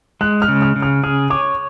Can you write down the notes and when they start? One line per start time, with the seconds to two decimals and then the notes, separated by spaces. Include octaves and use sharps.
0.21 G#3 F#6
0.42 F6
0.48 C#3
0.62 F6
0.76 C#3
0.82 F6
1.04 G#4 F6
1.30 C#5 D6